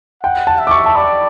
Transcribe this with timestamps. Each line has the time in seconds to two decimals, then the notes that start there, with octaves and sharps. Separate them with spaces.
0.23 F#5 G5
0.47 A5
0.59 E5
0.67 D6
0.71 C#6
0.86 A5
0.95 D5 B5